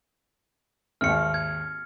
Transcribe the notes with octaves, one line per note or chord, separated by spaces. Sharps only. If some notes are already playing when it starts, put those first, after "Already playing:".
G#1 D#2 F6 C#7
G#6